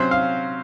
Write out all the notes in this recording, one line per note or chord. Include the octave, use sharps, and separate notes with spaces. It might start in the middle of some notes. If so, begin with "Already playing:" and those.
Already playing: C3 F#3 C#4 C5
F5